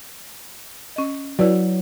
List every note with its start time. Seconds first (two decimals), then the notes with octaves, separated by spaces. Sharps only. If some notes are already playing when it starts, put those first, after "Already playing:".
0.96 C#4 D#5
1.39 F#3 E4 B4 D5